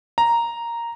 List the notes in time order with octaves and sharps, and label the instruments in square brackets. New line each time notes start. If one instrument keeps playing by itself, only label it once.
[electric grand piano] A#5